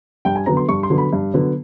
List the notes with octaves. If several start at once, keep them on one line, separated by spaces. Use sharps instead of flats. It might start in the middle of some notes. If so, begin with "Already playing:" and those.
G2 G5
G#5
D3 F#3 B3 A#5
C6
G2 C#6
C6
D3 F#3 B3
B5
G2
D3 F#3 B3